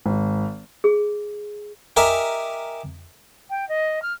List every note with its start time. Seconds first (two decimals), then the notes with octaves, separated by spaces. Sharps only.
0.06 G#1
0.84 G#4
1.96 G4 A#4 D#5 E5 G#5 A#5
3.50 G5
3.68 D#5
4.02 F6